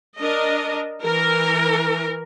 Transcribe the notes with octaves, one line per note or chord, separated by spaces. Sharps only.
D4 A#4 D#5
E3 A#4